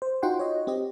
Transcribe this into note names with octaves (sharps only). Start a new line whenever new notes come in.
C5
D#4 F4 F#4 F#5 G5 C6
C#5 D#5
C4 G4 D#5